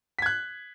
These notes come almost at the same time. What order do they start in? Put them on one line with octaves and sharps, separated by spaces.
B6 G#6 F#6